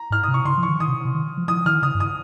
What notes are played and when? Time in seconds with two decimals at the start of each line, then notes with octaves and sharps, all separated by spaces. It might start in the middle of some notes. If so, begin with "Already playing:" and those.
Already playing: A#5
0.10 G#2 F6
0.23 C3 D#6
0.34 C#6
0.45 C#3 C6
0.57 F3
0.63 C#6
0.69 D#3
0.80 D#3 D#6
0.88 C3
1.05 C3
1.15 D#3
1.37 F3
1.48 F3 D#6
1.66 D#3 F6
1.82 C#3 D#6
1.95 G2
2.00 D#6